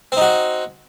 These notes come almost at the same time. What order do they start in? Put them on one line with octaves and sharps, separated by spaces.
C4 D#4 F#4